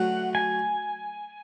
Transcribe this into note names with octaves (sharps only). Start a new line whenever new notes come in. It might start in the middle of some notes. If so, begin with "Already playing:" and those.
Already playing: D3 F#3 A3 F#5
G#5